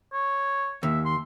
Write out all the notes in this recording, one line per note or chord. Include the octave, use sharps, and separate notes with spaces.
C#5
D#2 E5
C6